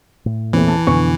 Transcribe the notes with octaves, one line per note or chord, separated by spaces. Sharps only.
A2
E2 A#2 E3 A3 C4 C#4
A5
F2 B2 D3 B3 G#5 C#6